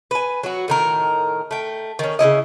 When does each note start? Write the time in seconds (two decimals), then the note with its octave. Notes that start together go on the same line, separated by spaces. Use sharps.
0.11 B4 G#5
0.43 F#3 F#4
0.68 A2 D#3 A#4
1.51 A3 G5
1.99 D#3 C#4
2.19 C#3 C4 E4 D#5